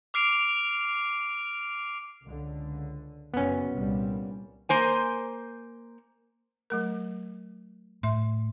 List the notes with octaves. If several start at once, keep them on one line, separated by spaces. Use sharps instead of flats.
D6 F6 C7 D7 F7
C#2 D3
F#1 F#3 B3 C#4
C2 A#2 G3
A#3 C5 G#5
F#3 A3 A#4
A2 E5 C6